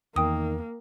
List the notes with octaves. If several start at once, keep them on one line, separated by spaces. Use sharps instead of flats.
E2 D#3 A#3 G5 D#6